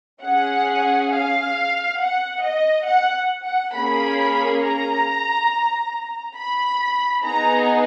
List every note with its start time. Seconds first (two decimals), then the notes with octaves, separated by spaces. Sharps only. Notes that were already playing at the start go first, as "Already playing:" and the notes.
0.23 C#4 G#4 F#5
1.11 F5
1.98 F#5
2.43 D#5
2.86 F#5
3.44 F#5
3.74 A#3 C#4 G#4 B5
4.61 A#5
6.37 B5
7.24 B3 D#4 G#4 A#5